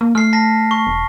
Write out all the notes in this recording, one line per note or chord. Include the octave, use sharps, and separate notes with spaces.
A#3
A3 F6 C7
A5 A#6 B6
C#6
E1